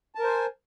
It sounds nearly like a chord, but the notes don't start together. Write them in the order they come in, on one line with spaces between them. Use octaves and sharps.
A5 A#4 C5 G#5